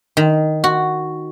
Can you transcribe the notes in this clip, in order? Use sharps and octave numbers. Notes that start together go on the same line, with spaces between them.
D#3
F#4